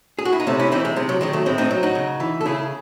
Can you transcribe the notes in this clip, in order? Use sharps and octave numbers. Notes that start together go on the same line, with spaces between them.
G#4
F#4
E4
D#4
C3 A3 C#4
C#4 E4
E3 C4 D#4
G#3
C3 G#3
F#3
D#3 F#3 G#3
F#3 A3
A2 G#3 C4
C4 D#4
F#3
D#4 F#4
C#3
E3
A4
C#3 E4 G#4